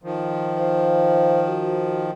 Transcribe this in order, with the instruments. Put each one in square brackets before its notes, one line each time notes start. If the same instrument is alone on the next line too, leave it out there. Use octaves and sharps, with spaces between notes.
[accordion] D#3 F3
[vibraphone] C5 F5
F#4